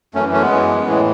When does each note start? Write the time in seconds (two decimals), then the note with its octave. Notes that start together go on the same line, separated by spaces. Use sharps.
0.15 F#2 E3 A3 C#4
0.33 A3 C#4
0.41 G#3 B3
0.51 F#2 E3
0.86 A2 E3 G#3